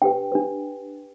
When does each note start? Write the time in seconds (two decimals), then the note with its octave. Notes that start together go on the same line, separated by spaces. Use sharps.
0.02 D4 G4 B4 G5
0.32 D4 G4 B4